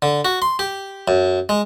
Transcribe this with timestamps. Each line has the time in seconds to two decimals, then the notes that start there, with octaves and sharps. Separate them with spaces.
0.02 D3
0.25 F#4
0.42 C6
0.59 G4
1.08 F#2
1.49 G#3